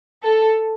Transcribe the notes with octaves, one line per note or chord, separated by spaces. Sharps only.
A4